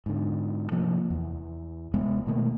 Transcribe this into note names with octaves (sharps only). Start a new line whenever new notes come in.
G#2 D3
C3 F3 A#3
E2
C3 G#3 B3
B2 D#3 A3 A#3